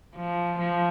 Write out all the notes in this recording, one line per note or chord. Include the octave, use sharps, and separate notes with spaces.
F3
F3